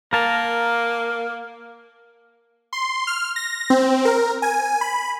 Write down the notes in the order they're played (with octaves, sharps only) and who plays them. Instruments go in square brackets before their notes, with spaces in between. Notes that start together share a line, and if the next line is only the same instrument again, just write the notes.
[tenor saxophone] A#3 [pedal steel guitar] A#4 A5 A#5
[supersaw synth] C6
F6
A#6
C4
A#4
G#5
B5